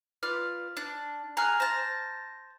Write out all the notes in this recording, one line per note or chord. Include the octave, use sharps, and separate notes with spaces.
F4 B4 D5 F6
D4
G#4 F#5 A#5 F6
C5 A5 A#6